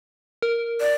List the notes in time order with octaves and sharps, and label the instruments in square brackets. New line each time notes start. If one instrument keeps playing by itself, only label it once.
[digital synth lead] A#4
[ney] D5